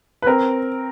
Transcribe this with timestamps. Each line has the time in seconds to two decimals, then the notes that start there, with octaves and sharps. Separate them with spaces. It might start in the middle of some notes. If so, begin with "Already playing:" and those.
0.22 B4
0.26 C4 A#4